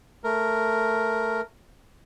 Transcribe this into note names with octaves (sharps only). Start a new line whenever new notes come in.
A3 A#4